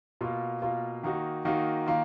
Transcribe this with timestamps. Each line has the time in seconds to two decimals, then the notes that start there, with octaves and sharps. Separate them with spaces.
0.21 B2 A#3 F4
0.62 B2 A#3 F4
1.03 D#3 A#3 D#4 F#4
1.45 D#3 A#3 D#4 F#4
1.86 D#3 A#3 F4